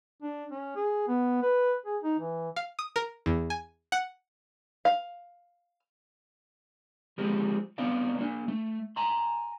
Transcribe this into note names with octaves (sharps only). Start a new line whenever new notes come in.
D4
C#4
G#4
B3
B4
G#4
D#4
E3
F5
D#6
A#4
E2
G#5
F#5
F5
F3 G#3 C4 G4
B3 C4 D4 D5 F5
A#3 D4
A3
G#5 A#5 C6